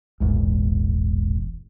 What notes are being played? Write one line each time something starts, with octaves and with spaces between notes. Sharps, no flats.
E1 A#1 E2 G#2